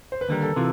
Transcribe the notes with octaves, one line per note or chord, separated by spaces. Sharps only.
C5
B4
D#2 D3 G3 A#4
A4
C3 E3 F4